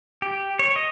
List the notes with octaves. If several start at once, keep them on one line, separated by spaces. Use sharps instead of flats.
G4
C#5
D#5